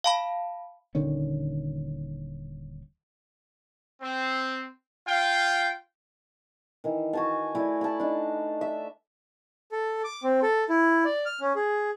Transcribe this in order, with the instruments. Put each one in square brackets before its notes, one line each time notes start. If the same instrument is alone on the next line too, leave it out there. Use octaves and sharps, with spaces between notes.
[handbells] F5 A5 B5
[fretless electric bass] D#1 D3 D#3 C#4
[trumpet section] C4
F4 F5 G5
[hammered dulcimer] D#3 E3
F#4 G#5 A5
A3 E4 D5 G#5
A5 B5
D4 D#4
E5
[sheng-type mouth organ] A4
D6
C4
A4
E4
D5
F6
C#4
G#4